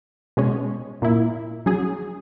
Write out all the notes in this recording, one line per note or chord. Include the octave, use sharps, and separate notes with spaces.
B2 G#3 C#4
A#2 A#3 E4
F#3 C#4 G#4